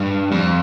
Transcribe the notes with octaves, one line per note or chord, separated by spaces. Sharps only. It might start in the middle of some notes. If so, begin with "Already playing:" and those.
Already playing: G2
F2